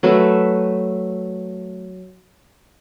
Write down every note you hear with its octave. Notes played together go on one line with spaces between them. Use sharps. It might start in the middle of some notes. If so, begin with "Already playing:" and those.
F#3 A3 B4 E5